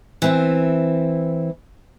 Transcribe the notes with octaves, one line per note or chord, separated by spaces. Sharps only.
E3 C4 E4